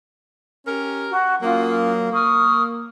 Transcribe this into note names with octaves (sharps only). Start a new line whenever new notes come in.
C#4 G4 A#4
F#4
F#3 A#3 C#4 F4 D#6
A#3 C#6 D#6 F6